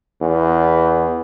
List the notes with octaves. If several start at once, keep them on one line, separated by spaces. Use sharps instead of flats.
E2